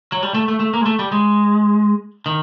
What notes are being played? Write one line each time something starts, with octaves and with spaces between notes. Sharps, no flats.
F#3
G3
A3
A3
A3
A#3
G#3
A3
G3
G#3
D#3